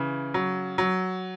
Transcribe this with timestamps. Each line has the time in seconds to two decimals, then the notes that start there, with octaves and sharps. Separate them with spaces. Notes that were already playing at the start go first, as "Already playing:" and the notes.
Already playing: C#3 E3
0.34 F#3
0.78 F#3